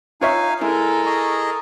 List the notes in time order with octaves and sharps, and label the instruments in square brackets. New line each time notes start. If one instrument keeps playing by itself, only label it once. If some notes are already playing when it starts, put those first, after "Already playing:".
[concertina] D#4 F5 G#5 [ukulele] F4 C#5 E5
[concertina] G#3 [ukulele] E4 [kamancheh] A4 A#4 [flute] G#5
[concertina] G#4 D#5 [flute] C#6